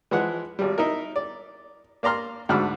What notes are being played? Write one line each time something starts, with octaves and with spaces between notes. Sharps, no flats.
E3 F3 G#3 F#5
G#1 G3
D#4 E4 A#4
D5
A#3 D5 A#5 C6 F6
D2 G#2 D4 F#4 B5 F6